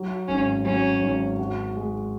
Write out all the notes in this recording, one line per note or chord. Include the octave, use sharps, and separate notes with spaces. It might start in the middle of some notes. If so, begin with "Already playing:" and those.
Already playing: F#3
G#1 C#4
F#3 C#4
G#1
F#4
G#3